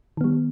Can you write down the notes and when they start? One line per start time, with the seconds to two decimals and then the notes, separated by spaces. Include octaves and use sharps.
0.17 D#3
0.21 B3
0.24 G3